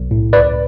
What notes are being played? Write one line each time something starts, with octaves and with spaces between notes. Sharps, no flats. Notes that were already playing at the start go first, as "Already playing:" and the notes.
Already playing: B1
A2
C#2 B4 D5